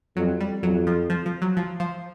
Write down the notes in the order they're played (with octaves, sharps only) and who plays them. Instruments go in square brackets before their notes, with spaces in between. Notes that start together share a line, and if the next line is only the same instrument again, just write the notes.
[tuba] F2 [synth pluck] F#3
[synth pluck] G3
[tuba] F2 [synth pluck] F#3
[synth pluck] F3
F3
F3
F#3
F3
F3